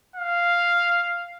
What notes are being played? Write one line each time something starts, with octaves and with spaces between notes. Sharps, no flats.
F5